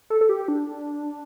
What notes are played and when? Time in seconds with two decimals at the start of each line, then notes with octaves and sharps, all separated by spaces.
0.10 A4
0.21 A4
0.29 G4
0.48 D4